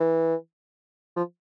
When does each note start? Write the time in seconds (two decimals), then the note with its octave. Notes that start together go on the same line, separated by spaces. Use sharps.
0.01 E3
1.17 F3